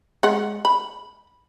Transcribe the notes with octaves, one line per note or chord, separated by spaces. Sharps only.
G#3 F#5
B5